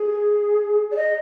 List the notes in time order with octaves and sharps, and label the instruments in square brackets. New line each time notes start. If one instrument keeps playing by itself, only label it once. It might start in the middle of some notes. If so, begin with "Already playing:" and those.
Already playing: [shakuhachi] G#4
D5
D#5